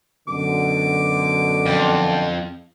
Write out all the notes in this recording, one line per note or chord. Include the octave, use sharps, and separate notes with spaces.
F#2 B2 D3 D6
F2